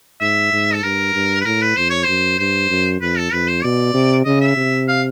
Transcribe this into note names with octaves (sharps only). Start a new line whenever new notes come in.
G#2 E5
G#2
A4
G2 A#4
G2
B4
A2 A#4
B4
F2 C5
C#5
F#2 C5
G2 C5
F#2
F2 B4
A4
F2 B4
C5
B2 D5
C3
C#3 D#5
E5
C3
F5